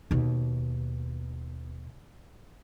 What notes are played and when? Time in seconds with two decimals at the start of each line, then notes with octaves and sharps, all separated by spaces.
0.11 D#2 B2